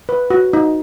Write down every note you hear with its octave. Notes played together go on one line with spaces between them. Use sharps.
B4
F#4
D#4